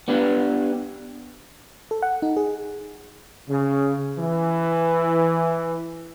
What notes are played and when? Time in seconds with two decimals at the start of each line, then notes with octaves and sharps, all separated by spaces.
0.08 B3 D4 G4 B4
1.91 A4
2.02 F#5
2.22 D#4
2.37 G#4
3.50 C#3
4.17 E3